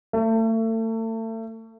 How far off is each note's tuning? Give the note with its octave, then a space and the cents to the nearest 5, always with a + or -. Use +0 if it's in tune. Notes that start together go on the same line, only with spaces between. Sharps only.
A3 +35